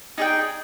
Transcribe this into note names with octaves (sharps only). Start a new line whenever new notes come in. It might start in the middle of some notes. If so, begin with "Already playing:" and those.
D#4 G#4 D5 G5